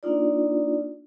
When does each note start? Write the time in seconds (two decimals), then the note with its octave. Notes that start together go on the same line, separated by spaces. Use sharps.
0.03 A#3 D4 D#4 F4 D5